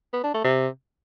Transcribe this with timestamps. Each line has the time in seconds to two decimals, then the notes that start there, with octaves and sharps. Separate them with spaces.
0.13 B3
0.24 D4
0.34 A3
0.44 C3